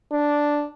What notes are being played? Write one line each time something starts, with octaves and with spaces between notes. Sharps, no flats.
D4